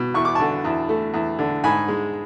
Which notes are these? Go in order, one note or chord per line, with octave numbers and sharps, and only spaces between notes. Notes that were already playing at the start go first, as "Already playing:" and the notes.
Already playing: B2
E2 C#6
D6
D3 A5 C#6
E2
A3
E2
D3
G#2 G#5 B5
G#3